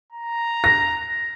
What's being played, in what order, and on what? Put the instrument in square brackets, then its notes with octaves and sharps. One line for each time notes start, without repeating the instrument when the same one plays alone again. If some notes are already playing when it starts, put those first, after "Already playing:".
[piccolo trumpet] A#5
[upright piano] A#6